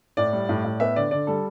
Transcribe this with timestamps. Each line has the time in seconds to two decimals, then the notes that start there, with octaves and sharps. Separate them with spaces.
0.17 A2 D5
0.33 G3
0.49 A2
0.65 A2
0.80 B3 E5
0.96 D3 D5
1.11 D3 D5
1.27 G3 A4